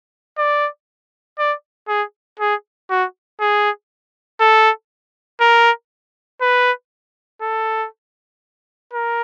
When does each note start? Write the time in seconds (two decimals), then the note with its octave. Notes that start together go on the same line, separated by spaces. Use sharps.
0.38 D5
1.39 D5
1.88 G#4
2.40 G#4
2.90 F#4
3.40 G#4
4.40 A4
5.41 A#4
6.41 B4
7.42 A4
8.93 A#4